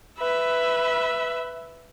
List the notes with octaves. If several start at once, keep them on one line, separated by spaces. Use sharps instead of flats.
B4 E5